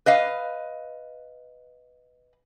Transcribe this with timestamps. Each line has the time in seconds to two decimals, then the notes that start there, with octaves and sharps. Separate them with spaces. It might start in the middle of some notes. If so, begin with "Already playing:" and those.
0.06 B4 D#5 F5